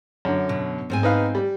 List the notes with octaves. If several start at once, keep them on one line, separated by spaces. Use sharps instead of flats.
F#2 D3
B2
G#2 C4 G#5
D#4 B4 F5
G3